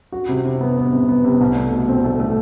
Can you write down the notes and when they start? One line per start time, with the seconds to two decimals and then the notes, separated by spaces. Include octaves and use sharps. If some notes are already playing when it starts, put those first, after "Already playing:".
0.12 F#4
0.29 C3
0.45 C3
0.61 B3
0.77 B3
0.93 C3
1.09 B3
1.24 C3
1.41 C2
1.56 A3
1.72 B2
1.88 C4
2.04 A3
2.20 A3